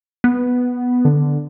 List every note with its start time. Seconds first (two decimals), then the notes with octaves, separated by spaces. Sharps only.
0.24 B3
1.05 D3